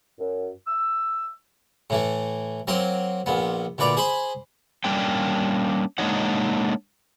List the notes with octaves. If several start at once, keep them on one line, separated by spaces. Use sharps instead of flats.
F#2
E6
A2 E3 A3
F#3 A#3 C4 C6
A#1 A#2 B3
D2 A#2 B4 D5 A#5
G#4 C5 B5 C6
G3 A#3 C#4 D4 G5
G#3 A#3 D4 D#4 C#5 F#5